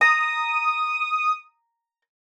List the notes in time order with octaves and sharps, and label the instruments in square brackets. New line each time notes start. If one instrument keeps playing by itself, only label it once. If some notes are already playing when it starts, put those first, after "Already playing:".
[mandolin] A#5 [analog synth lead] D#6